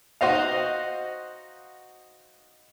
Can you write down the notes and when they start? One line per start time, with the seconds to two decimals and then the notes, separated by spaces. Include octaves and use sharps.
0.21 D#4 F#4 C5 D#5 F5